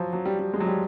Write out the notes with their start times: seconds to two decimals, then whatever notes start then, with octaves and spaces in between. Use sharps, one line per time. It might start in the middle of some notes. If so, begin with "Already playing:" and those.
Already playing: F3 F#3
0.13 F#3
0.26 G3
0.39 G3
0.54 G#3
0.60 F#3
0.67 G3